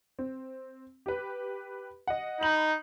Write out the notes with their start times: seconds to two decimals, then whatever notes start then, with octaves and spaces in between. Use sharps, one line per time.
0.19 C4
1.06 G4 B4
2.07 D#5 F#5
2.41 D#4 B5 F#7